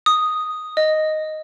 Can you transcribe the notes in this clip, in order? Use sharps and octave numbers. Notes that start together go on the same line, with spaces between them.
D#6
D#5